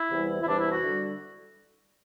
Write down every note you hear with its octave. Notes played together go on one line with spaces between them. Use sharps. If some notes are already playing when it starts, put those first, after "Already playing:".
Already playing: E4
E2 C3 E3 G3
E4
E2 C3 E3 G3 D4
E4
F#4
D3 G3